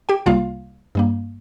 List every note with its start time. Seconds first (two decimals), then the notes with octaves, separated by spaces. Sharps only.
0.09 G4 G5
0.26 C2 C3 G3 A#3 F4 F5
0.95 G2 G3 A#3